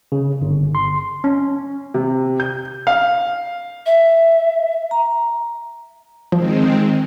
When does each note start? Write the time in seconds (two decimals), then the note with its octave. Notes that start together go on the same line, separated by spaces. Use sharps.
0.12 C#3
0.42 G1
0.75 C6
1.24 C#4
1.94 C3
2.40 G6
2.87 F5
3.86 E5
4.91 A#5
6.32 D#3 F3 G#3 C4